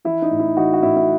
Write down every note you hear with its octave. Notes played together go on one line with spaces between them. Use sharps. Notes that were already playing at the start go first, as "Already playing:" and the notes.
E3 E4
D#4
A2
E4
E3 D#4 F#4
F#4
A2 E4
E4